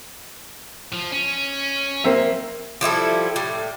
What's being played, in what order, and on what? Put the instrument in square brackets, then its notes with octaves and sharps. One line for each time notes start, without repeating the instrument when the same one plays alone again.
[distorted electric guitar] F3
C#4
[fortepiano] A#3 C4 E5
[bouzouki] F3 G3 E4 A4
A2 G3